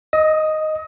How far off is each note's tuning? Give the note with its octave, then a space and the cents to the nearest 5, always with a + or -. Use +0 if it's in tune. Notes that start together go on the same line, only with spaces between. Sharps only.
D#5 +0 D#6 +40